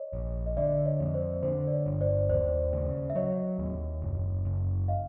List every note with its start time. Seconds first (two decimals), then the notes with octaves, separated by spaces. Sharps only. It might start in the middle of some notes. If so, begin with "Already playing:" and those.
Already playing: C#5 D#5
0.13 A#1
0.46 D#5
0.57 D3 D5 E5
0.85 C#5 D#5
1.00 F2
1.14 C5 D5
1.43 D3 C5
1.67 D5
1.72 C#5
1.86 G1
2.01 C5 D5
2.29 D#2 C5 D5
2.73 C#3
3.10 E5
3.15 F#3 C#5 D#5
3.59 D#2
4.02 F#1
4.45 F#1
4.88 D#5 F5